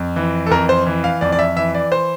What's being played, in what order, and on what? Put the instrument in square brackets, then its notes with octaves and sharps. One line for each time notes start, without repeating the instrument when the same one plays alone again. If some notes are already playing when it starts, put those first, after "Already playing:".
Already playing: [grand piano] F2
E3
A4
F2 A#4
C5
E3
F5
F2 D5
D5
E5
E3 E5
D5
C5